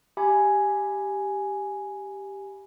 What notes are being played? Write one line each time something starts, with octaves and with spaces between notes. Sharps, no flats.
G4 E5 G#5 B5